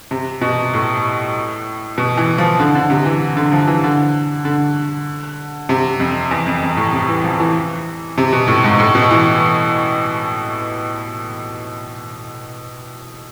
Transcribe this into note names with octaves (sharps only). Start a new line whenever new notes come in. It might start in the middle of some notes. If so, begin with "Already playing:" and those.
C3
B2
A2
B2
E3
F3
D3
D3
C3
E3
D3
F3
E3
D3
D3
C3
F2
E2
F2
F2
A2
C3
E3
F3
E3
C3
B2
A2
G#2
A2
B2
E3